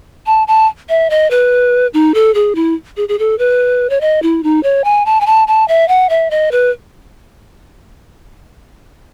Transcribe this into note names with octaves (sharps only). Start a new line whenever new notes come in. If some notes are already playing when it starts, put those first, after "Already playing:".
A5
A5
E5
D#5
B4
D#4
A4
G#4
E4
G#4
G#4
A4
B4
C#5
D#5
E4
D#4
C#5
G#5
A5
G#5
A5
A5
E5
F#5
E5
D#5
B4